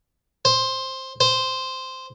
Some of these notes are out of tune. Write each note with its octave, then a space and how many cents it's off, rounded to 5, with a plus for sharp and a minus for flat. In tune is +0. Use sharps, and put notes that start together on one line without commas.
C5 +10
C5 -5